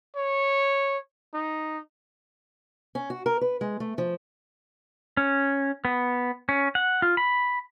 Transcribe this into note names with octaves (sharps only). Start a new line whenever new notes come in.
C#5
D#4
C#4
F#4
A#4
B4
G#3
A3
F3
C#4
B3
C#4
F#5
F4
B5